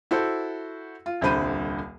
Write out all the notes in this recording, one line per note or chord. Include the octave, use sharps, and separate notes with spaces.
E4 F#4 A4 C5
F4
D#1 C2 D3 C5 B5 D#7